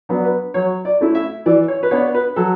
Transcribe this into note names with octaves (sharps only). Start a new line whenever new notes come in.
F#3 B3 D4
B4
F#3 C#5
D5
A3 C#4 E4
E5
E3 D5
C#5
B4
B3 D4 C#5
B4
F#3 A4